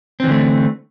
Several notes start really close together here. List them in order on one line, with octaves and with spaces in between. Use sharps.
C4 E3 D3 A3